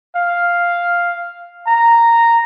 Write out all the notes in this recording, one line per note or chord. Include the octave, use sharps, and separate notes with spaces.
F5
A#5